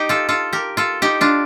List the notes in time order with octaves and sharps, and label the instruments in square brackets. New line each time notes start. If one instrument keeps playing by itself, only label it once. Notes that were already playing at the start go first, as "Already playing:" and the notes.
Already playing: [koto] D#4 G4
F4 A4
F4 A4
G4 A#4
F4 A4
D#4 G4
D4 F4